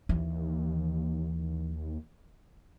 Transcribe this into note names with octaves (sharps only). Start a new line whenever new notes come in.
D#2 E3